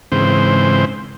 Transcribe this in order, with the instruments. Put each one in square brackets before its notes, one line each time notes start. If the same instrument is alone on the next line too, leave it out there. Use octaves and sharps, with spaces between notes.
[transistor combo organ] G#2 C#3 E3 C4 C5